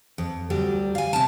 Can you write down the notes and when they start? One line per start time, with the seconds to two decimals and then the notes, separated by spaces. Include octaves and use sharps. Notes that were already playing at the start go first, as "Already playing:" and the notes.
0.18 F2
0.50 D2 F#3 G3
0.95 F5 G#5
1.13 C3 A5